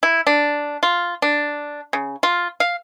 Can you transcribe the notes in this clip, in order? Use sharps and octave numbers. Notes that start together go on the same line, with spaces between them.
E4
D4
F4
D4
C#3
F4
F5